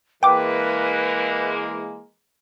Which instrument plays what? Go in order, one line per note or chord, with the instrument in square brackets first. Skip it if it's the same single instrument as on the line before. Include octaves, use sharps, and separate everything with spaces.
[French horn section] E3 G#3 A#3 [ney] B4 [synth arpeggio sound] G5 D6